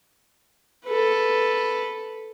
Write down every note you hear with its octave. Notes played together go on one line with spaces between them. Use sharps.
A4 B4